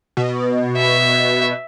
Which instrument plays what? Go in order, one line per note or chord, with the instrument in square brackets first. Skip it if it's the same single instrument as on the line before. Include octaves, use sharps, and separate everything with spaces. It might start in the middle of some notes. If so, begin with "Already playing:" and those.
[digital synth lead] B2
[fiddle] E5